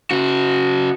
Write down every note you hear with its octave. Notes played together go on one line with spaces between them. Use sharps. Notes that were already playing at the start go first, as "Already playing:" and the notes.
C#3 F#4